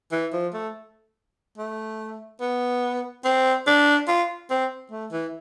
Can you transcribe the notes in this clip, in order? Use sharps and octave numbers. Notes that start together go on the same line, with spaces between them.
E3
F3
A3
A3
B3
C4
D4
F4
C4
A3
E3